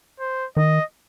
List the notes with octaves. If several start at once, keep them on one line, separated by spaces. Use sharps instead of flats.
C5
D#3 D#5